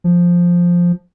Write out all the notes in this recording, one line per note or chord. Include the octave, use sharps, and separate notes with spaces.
F3